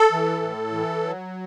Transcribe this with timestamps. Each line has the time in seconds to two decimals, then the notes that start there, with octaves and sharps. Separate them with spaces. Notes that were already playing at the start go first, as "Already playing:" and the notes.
Already playing: A4
0.12 E3
0.42 A2
0.72 E3
1.03 F#3